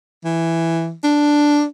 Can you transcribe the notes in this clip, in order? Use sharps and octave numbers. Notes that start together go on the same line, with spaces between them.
E3
D4